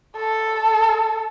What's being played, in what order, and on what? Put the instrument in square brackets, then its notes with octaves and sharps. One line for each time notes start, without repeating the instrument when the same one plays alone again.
[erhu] A4